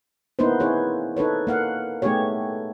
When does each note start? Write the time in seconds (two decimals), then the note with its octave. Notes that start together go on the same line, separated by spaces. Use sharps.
0.39 A#3 B3 D#4 E4 B4 C5
0.60 C4 D#4 E4 G#4 C#5
1.17 D#4 A4 B4 C#5
1.47 A#3 F5 F#5
2.02 A3 B3 D#4 G4 G#4 C#5